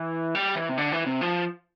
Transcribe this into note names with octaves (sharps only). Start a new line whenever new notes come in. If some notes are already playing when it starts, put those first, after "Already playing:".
Already playing: E3
G3
E3
C3
D3
E3
C3
F3